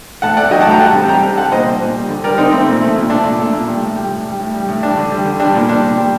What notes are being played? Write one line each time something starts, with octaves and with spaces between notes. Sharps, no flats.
A2 F#5 A5
A3 D5 F#5
F#3 D#5 G5
F#5 A5
A2 G5 A#5
G3 F#5 A5
C3
G3 G5 A#5
C3
G3 F#5 A5
A#2 C5 D#5
G3
A#2
G3
D3
G3 A#4 D5
D3 C4 D#4
A3 C4
A#2
A3
A#2
A3 D4
A#2
A3
A#2
G3
A2
G3
A2
G3
A2
G3
A2
G3 D4
D3
G3
D3
G3 D4
A#2
G3 D4
A#2
G3